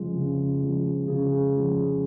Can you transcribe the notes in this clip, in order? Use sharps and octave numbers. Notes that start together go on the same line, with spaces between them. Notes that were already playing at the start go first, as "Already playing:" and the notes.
Already playing: C#3 F3 G#3
C#3
F3 G#3
C#3 G#4
F3 G#3